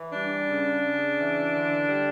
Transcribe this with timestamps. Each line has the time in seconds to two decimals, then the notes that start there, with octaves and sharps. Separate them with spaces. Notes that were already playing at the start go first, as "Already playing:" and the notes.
Already playing: E3
0.12 G3 D4
0.48 C#3
0.82 C#3
1.18 E3
1.53 D3
1.88 G3